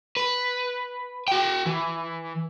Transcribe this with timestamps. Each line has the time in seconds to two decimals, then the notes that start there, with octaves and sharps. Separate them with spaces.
0.17 B4
1.28 F#4 G5
1.66 E3